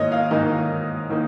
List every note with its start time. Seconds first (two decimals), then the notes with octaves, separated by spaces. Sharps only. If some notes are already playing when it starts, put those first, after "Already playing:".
Already playing: G#2 D#3 A#3 C#5 D#5
0.12 F5
0.31 G#2 D#3 A#3 D#4 D#5
1.10 D#3 A#3 D#4